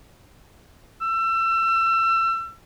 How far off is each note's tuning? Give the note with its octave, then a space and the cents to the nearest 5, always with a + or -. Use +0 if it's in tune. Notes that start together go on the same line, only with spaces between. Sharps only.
E6 +30